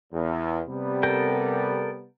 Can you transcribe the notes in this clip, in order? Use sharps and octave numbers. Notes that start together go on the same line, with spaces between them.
E2
C3 G3 B3
A4 A#4 G5